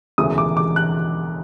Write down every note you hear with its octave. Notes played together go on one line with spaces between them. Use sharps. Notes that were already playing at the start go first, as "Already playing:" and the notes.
E1 D2 C#3 E3 D#6
D6
D6
F#6